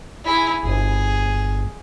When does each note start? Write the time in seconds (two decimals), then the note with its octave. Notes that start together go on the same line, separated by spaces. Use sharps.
0.24 E4 G#4
0.63 G1 G#4